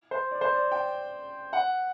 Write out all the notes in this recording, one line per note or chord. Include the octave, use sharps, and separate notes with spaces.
C5
D5
C5
D5
G5
F#5